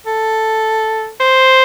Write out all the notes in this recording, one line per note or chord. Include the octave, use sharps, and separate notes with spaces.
A4
C5